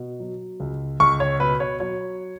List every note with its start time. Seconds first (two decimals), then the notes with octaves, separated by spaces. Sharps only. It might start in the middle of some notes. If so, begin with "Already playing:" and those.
Already playing: B2
0.20 F#3
0.60 C#2
1.00 C#2 C#6
1.20 C#5
1.40 B2 B4
1.60 C#5
1.80 F#3 C#5